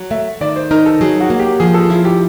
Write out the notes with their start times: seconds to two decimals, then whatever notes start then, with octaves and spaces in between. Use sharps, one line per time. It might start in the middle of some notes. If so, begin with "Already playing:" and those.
Already playing: F#3
0.11 A3 E5
0.41 D#3 D5
0.56 C5
0.71 D#4 A#4
0.86 A4
1.01 F#3 G#4
1.20 F#4
1.30 A#3
1.40 G4
1.60 F3 G#4
1.74 A4
1.90 E4 F4
2.05 G4